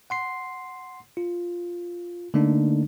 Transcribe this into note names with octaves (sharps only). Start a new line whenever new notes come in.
F#5 C6 C7
F4
D3 A3 A#3 D4 D#4